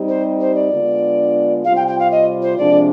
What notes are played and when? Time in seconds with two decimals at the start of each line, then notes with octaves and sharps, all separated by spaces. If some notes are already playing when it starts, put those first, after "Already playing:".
Already playing: G3 C4 D#4 G4
0.09 C5
0.40 C5
0.55 D5
0.71 D3 G#3 B3 D4 F4
1.65 C3 G3 C4 F4 F5
1.76 G5
1.88 G5
1.99 F5
2.11 D#5
2.42 C5
2.57 C3 F3 G#3 D4 D5